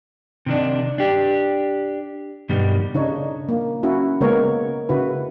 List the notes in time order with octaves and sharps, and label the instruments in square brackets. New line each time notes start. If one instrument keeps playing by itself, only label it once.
[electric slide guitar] C3 D#3 D4
D4 G4
G2 B2 D#3 G3
[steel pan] C#3 D4 D#4 C#5
A#3
C#4 E4 F#4
C#3 G#3 A#3 B3 A#4 C#5
C#3 E4 F#4 B4